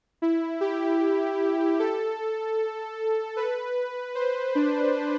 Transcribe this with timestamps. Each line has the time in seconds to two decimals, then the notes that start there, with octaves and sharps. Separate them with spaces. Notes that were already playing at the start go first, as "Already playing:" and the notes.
0.22 E4
0.61 G4
1.79 A4
3.36 B4
4.15 C5
4.55 D4